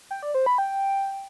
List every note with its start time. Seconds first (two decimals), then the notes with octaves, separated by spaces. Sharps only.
0.11 G5
0.23 D5
0.34 C5
0.46 B5
0.58 G5